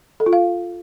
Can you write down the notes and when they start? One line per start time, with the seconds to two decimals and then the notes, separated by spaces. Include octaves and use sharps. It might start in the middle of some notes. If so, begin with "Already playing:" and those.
0.20 A4
0.26 F4
0.33 F5